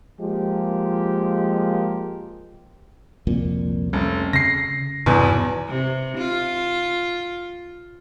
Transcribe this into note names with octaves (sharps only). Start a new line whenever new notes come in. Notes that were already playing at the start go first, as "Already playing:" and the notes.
F3 G#3 A#3 G4
C2 F2 A#2
F1 G3 A3 C#4
C#3 A#6 C7
B1 E2 G2 C3 E3 B3
C3
F4